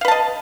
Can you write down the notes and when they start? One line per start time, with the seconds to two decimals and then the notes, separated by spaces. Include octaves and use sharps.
0.01 F5
0.05 B4
0.08 A5
0.11 D#5